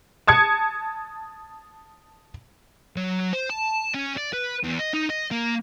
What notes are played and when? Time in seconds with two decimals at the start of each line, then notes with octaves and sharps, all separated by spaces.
0.27 A5 D#6 G#6 C#7
2.96 F#3
3.33 C5
3.50 A5
3.94 C#4
4.17 D5
4.33 B4
4.63 E2
4.79 D#5
4.93 D#4
5.10 D#5
5.31 A#3